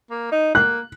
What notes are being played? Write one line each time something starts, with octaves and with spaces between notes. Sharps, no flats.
A#3
D#4
A#3 F#6